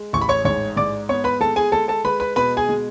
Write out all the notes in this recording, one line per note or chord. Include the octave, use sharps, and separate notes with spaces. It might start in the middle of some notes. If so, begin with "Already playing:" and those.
Already playing: G#3
A1 C#6
B5
C#5 C#6
G#2 C#5 C#6
G#2 D5 D6
B3 C#5 C#6
B4 B5
G#3 A4 A5
G#4 G#5
G#3 A4 A5
A4 A5
G#3 B4 B5
B4 B5
B2 B4 B5
G#4 G#5
G#3